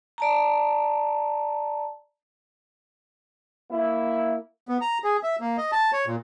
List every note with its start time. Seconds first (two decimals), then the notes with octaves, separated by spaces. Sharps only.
0.18 D5 A5 A#5
3.70 A#3 E4
4.69 B3
4.81 A#5
5.04 G#4
5.23 E5
5.41 A#3
5.58 D#5
5.72 A5
5.93 C#5
6.07 A#2